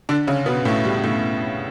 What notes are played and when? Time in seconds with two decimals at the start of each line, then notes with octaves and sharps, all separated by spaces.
0.09 D3 D4
0.27 C#3 C#4
0.46 B2 B3
0.65 A2 A3
0.85 G3
1.04 A2 A3